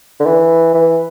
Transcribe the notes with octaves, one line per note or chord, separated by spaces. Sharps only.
D3
E3
E3